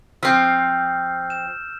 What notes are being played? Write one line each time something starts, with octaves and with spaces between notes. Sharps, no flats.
F3 C4 E6 F6 G6
E7